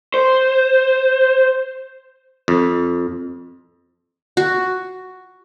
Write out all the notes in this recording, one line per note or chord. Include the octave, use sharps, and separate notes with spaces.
C5
F2
F#4